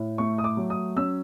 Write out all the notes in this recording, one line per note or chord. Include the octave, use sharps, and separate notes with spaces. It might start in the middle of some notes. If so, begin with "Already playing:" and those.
Already playing: A2
A3 C#6
D#6
D6
F#3
D#6
C#4 E6